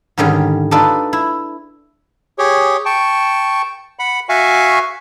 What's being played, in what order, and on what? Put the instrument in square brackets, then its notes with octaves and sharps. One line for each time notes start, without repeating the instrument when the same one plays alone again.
[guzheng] G#2 D3 D#3 G3 C#4 G#4
D4 D#4 F4 A4 B4 D5
E4
[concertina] G4 G#4 C#5
G5 A5 C#6
F#5 B5
F#4 E5 F5 G#5 C#6